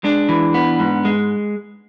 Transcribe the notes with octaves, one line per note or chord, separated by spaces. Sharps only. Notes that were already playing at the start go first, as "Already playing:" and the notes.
G#3 D4
E3
B3
G#2
G#3